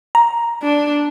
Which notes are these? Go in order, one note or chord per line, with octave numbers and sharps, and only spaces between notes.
A#5
D4